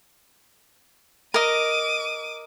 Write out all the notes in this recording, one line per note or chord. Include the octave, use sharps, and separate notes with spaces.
A#4 D#5 D6 D#7